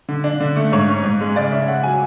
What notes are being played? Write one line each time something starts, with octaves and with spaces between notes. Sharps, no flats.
D3
D4
D3
A3
G#2 C#5
C#4
G#2
G#3
C#3 D5
C#4 E5
C#3 F#5
F#3 G#5